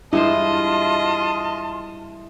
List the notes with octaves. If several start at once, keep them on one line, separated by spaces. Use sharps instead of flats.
G2 G#3 E4 F4 C5 D#5 A5